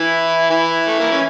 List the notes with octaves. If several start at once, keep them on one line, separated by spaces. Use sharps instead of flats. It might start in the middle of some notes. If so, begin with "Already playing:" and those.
Already playing: E3 E4
E3 E4
A3
A#3
C#4